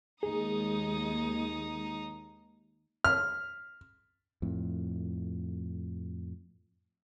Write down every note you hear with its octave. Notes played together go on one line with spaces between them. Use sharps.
D#2 G#3 D#4 G#4 D#6
F6
F2 A2